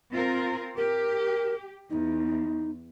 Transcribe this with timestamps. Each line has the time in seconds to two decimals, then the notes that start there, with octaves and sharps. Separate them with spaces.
0.11 C4 F4 A#4
0.77 G4 A#4
1.90 E2 D#4